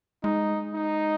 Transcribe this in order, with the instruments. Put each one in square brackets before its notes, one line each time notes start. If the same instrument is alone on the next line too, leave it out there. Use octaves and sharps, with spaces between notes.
[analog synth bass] G#3 [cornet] D#4
[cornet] D#4